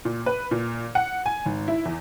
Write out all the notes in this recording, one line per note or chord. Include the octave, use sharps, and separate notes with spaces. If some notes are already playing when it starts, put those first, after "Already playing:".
A#2
B4
A#2
F#5
G#5
G#1
E4
E2